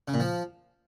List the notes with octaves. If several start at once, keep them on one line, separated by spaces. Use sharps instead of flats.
C#3
A#2
F3